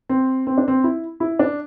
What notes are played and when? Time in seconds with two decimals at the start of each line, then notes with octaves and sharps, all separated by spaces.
0.09 C4
0.47 C4
0.58 D4
0.68 C4
0.84 E4
1.20 E4
1.39 D4